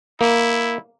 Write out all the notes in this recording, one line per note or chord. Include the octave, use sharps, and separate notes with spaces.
A#3 E4